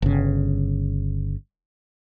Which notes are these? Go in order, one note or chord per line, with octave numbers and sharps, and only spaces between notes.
G1 C#3